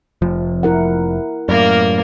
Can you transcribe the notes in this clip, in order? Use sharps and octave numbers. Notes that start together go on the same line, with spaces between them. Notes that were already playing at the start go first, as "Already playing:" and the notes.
F1 F3
E4 A#4 F#5
F#2 A2 A#3 A#4 D5